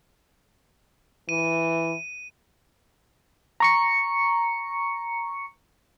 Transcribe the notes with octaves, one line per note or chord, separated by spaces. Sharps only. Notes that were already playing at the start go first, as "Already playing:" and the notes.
E3 D#7
A#5 C#6 C#7